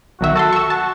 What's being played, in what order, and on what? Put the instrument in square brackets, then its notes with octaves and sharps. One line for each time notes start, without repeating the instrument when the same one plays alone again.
[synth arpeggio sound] B1 D#3 E5 [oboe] F#4
[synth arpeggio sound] F#4 A5 C6 [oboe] A4
[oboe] E5 [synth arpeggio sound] C#6 E6
[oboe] F#4 [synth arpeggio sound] A5